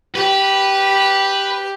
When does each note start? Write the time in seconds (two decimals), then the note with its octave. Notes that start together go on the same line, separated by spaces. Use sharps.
0.15 G4 B4